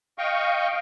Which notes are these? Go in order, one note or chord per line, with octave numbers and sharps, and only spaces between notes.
D#5 F5 G5 C#6